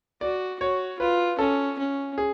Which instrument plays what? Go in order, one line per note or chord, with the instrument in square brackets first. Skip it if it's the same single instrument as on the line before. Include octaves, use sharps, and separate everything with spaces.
[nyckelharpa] F#4 [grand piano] D5
[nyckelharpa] F#4 [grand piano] C#5
[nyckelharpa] F4 [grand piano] B4
[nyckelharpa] C#4 [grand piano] A4
[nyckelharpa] C#4
[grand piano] G#4